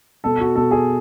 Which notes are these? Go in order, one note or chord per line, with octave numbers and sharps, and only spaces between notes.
B2 A4
F#4
B2 A4
G#4